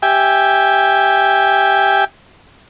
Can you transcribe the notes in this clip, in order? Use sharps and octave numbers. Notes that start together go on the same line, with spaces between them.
G4 E5 G5 G#5